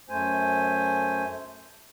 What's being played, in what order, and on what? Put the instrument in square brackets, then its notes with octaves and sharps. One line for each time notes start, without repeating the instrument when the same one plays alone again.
[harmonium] F#2 A3 C5 G#5